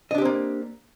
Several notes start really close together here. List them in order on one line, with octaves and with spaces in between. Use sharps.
D#5 D4 G4 C4 A#3